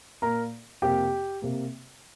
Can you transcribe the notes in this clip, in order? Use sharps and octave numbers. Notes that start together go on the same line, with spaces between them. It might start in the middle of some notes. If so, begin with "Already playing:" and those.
A#2 A#3 A#4 A#5
F2 C3 A#3 G4 G5
C3 A#3